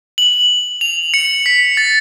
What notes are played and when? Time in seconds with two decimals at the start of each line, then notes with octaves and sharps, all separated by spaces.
0.18 F#7
0.81 F7
1.14 C#7
1.46 B6
1.77 A6